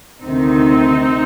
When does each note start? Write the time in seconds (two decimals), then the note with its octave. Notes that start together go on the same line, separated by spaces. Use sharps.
0.23 D2 C3 D#3 C4 D#4